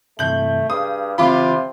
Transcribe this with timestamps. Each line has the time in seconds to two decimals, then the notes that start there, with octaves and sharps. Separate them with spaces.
0.19 G2 C3 E3 A3 G6 F#7
0.70 G2 G#4 F5 D#6
1.18 C#2 C3 E3 C4 F4 B5 D6